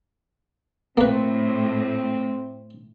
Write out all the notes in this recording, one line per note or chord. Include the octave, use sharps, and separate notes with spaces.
A2 A#3 C4 B4